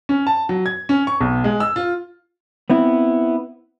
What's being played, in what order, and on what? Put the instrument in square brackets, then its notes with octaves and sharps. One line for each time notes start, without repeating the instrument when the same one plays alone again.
[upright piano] C#4
A5
F#3
G#6
C#4
C#6
B1
G#3
E6
F4
[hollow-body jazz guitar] B3 C4 E4